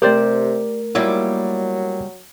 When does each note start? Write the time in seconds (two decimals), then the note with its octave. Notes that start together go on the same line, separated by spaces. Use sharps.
0.02 C3 A3 G4 A#4 C5 D5
0.95 F#3 G3 A#3 E4 F4